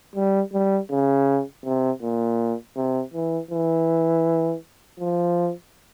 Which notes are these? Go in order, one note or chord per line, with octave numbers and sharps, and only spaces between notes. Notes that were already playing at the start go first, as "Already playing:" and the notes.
G3
G3
C#3
C3
A#2
C3
E3
E3
F3